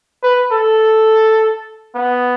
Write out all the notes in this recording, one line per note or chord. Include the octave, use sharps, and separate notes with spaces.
B4
A4
B3